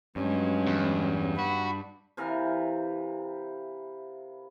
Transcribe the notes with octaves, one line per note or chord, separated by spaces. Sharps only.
G2 F#3 G#3 C#4
E2
F#4 B5
C3 E3 A#4 F5